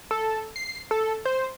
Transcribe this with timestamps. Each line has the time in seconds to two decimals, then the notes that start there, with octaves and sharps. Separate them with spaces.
0.11 A4
0.56 C7
0.91 A4
1.25 C5